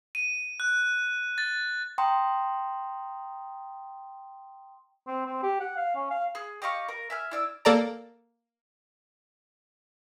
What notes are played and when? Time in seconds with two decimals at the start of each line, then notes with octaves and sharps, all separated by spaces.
0.15 D#7
0.60 F#6
1.38 A6
1.98 G5 A#5 C6 D#6
5.07 C4
5.26 C4
5.43 G4
5.60 F#5
5.77 F5
5.95 C#4
6.10 F5
6.35 G#4
6.62 G4 D#5 F5 C#6
6.89 A#4
7.10 E5 G#5 F6
7.31 E4 D5 E6
7.65 A#3 A4 D5 A#5